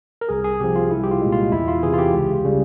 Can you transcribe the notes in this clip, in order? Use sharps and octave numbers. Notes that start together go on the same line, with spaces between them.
A#4
C2 G#4
G#4
C3 F3 G4
F4
C2 E4
G4
F4
A#2 G#3
F4
E2 E4
F4
C3 E3 G#4
F4
G4
C#2
C#3 G3